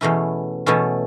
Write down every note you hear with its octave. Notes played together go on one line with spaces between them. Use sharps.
E2 B2 A3 C#4 E4
E2 B2 A3 C#4 E4